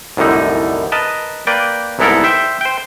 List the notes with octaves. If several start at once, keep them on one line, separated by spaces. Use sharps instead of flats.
C2 F#2 A2 D3 D#4
A#4 B4 D#5 A5
A#3 B4 D5 G5
C2 G#2 B3 E4 A4 A#4
C5 E5 G5
C5 G5